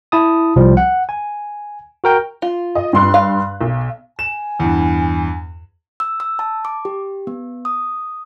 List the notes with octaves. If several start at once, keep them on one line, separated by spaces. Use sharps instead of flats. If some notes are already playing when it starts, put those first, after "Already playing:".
E4 A5 D#6
C2 C3 F3 G3
F#5
G#5
F#4 A#4 G5
F4
D#5
G2 C6 F#6
F5
B1
G#5 E7
E2 G2
E6
E6
A5
D6
G4
B3
D#6